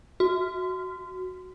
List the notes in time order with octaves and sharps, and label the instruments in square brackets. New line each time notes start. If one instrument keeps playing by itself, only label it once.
[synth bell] F#4